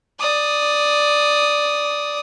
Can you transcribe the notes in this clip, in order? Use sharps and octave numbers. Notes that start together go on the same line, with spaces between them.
D5 D#6